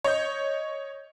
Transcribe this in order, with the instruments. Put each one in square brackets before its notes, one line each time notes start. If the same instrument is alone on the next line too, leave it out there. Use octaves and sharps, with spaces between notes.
[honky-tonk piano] C#5 D#5 G6